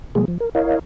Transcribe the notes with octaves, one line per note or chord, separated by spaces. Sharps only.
B2 F3 G3 G#3 A#3 G#4
F3
A#4
E4 A#4 C#5 D#5 F5